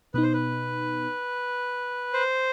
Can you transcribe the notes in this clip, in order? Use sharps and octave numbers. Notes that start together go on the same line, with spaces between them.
B2 B3 D#4 B4
C5
B4
C5